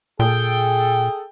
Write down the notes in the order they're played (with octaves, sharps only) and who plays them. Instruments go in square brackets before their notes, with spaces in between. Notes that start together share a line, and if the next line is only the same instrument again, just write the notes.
[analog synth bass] A#2 [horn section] G#4 A4 [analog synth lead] G5